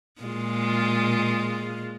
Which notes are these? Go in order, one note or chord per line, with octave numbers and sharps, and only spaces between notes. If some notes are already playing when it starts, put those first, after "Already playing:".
A#2 G#3 F4